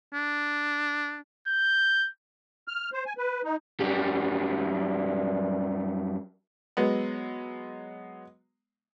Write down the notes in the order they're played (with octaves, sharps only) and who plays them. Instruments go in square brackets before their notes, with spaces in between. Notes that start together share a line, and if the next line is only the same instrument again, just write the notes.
[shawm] D4
[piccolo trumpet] G6
[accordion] F6
C5
G#5
B4
D#4
[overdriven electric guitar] F#2 G3
[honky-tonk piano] F#3 G#3 B3